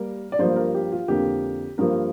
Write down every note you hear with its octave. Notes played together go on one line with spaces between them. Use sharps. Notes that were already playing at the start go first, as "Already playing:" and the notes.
Already playing: G3 A#3 A#4
D5
G2 F3 A#3 C5
A#4
G4
F4
F2 D3 A#3 G4
G2 F3 A#3 A#4